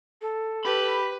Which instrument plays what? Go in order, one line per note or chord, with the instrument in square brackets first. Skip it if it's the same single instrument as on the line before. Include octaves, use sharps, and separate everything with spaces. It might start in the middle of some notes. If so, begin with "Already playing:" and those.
[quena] A4
[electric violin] G4 [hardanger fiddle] B4 [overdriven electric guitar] B5